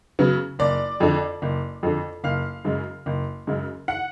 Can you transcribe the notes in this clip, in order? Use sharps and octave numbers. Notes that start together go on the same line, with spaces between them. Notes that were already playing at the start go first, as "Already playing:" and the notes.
C#3 F#3 B3
F#1 D5
F2 D3
F#1
F2 D3
F#1 F5
F#2 C#3 G#3
F#1
F#2 C#3 G#3
F#5